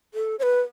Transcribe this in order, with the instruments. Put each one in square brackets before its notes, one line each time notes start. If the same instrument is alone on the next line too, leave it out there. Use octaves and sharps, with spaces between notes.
[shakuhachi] A4
C#5
B4